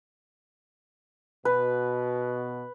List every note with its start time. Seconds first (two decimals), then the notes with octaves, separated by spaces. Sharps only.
1.45 B2 B4